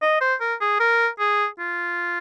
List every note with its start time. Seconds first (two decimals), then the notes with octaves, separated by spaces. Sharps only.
0.02 D#5
0.21 C5
0.40 A#4
0.61 G#4
0.80 A#4
1.19 G#4
1.59 F4